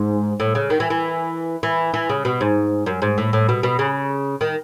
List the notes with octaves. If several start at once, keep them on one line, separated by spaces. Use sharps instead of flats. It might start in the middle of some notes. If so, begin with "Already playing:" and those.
Already playing: G#2
A2
C#3
D#3
E3
E3
E3
E3
C#3
B2
G#2
F#2
G#2
A2
A2
B2
B2
C#3
D#3